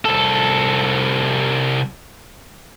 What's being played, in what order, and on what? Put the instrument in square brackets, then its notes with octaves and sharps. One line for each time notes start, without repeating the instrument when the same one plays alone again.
[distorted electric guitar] C2 A4